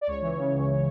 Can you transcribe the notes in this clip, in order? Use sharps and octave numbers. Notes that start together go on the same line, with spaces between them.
D5
C#2 C#5
E3
C#3
C#2